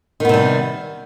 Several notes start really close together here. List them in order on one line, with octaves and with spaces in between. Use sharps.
D#3 B3 C3 G3